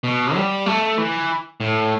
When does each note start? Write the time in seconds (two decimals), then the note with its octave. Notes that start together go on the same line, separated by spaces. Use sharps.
0.04 B2
0.35 G3
0.66 A3
0.98 E3
1.61 A2